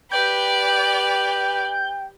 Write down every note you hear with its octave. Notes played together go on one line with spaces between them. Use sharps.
G4 B4 D5 G5 G6